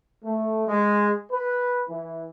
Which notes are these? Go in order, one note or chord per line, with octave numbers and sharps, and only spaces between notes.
A3
G#3
B4
E3